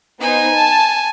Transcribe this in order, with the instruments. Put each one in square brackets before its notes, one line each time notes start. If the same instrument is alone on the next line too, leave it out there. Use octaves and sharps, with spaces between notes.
[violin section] B3 D#4 C5 [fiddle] G#5
[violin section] A5